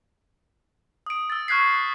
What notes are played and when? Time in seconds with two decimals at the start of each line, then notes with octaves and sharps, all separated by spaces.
1.06 D#6 D7
1.30 E6 A6
1.48 C#6 F6 F#6 G#6 B6 C7